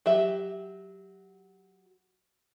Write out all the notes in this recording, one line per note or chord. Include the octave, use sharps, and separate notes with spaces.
F#3 G4 E5